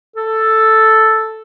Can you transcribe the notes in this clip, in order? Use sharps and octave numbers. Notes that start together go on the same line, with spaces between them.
A4